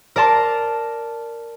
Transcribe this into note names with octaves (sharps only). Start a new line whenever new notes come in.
A#4 D5 A5 C6